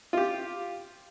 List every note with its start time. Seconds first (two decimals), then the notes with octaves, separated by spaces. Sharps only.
0.13 F4 G4